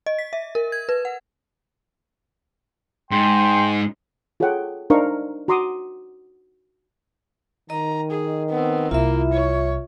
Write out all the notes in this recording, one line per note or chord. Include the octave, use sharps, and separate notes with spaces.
D#5
B6
E5
A#4
G#6
B4
F#5
G#2 G5 C6
F4 G#4 A4 C#5 F#5 G5
D4 D#4 A#4 C5 F5 C#6
F#4 A#5 C6 D6 D#6
D#3 D#5 A#5
G#4
B3 C4
C2 A#3 E4 F4 E5
C#5